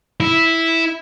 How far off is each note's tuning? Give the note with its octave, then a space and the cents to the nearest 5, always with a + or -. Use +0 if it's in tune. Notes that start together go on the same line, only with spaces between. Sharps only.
E4 -5